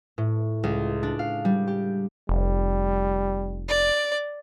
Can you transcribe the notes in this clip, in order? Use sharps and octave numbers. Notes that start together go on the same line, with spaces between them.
A2
C#2
D4
F5
G3
G4
F1 G3
D5